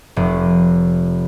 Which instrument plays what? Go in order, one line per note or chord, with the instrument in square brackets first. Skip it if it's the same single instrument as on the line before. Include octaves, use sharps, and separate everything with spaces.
[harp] F1